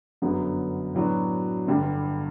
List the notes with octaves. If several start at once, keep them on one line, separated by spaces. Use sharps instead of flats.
G1 F#2 D3 F#3 B3
A2 F#3 B3 D4 F#4
G1 G2 D3 G3